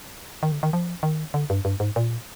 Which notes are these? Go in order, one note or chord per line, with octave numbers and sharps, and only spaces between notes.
D#3
D3
D#3
F3
D#3
D3
G2
G2
G#2
A#2